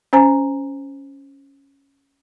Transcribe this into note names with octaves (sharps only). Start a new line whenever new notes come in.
C#4 C5 G#5 A#5